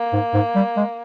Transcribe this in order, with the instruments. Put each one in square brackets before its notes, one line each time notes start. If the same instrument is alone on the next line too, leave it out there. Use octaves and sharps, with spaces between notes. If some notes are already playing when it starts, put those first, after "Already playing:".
Already playing: [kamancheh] A#3
[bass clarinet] G#2
G#2
G3
G#3